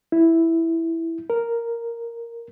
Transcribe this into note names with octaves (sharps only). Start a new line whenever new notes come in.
E4
A#4